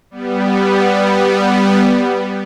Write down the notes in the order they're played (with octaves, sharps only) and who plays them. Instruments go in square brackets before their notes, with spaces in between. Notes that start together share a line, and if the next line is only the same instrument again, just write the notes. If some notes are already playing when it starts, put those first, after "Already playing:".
[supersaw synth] G3 B3